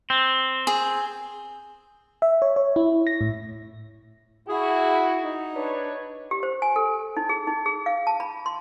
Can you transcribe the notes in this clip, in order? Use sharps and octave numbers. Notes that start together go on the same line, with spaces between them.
C4
G#4
E5
C#5
C#5
E4
A#6
A2
E4 F#4 G#4
D#4
D4 B4 C#5
G4
C5
G#5
A4
D#4
G#4
D#4
G#4
F5
A5
B5
C6